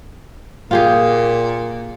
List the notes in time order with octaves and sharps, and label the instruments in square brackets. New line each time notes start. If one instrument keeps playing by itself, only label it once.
[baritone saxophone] A#2 [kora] F4 G4 G#4